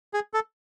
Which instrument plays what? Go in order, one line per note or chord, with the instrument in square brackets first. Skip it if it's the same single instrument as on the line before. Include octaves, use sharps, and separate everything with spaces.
[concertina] G#4
A4